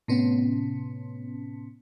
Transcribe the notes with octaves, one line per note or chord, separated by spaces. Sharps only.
A2 C3 B3 C#4